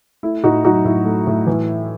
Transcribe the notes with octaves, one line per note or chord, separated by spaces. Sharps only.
A3 E4
A2 D#4 F#4
F#3 D#4 F#4
A2 E4
A3
A2
E3